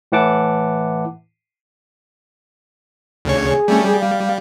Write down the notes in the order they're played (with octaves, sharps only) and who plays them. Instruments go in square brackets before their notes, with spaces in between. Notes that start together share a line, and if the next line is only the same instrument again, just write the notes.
[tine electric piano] A2 E3 E4 F#5 A5 D6
[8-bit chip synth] D2 C#3 C#5
[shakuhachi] G#4
[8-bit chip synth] G3 A3 C#4
[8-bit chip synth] G3 [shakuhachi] G#4
[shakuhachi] F5